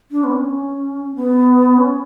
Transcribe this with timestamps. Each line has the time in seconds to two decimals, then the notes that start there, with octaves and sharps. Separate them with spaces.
0.11 D4
0.24 B3
0.32 C#4
1.15 B3
1.78 C#4